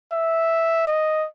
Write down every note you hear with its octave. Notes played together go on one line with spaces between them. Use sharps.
E5
D#5